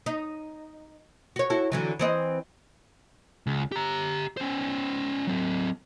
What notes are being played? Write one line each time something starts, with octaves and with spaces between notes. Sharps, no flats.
D#4
F#4 C#5
E4 F#4 A4
D3 E3 F#3
E3 C4 D#5
C#2
G4 A#5
C#4 C5
F#3 C4